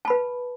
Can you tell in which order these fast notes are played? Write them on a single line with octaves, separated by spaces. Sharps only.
A5 B5 B4